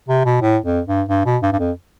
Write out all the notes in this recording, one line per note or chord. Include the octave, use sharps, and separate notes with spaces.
C3
B2
A2
F2
G2
G2
B2
G2
G2
F2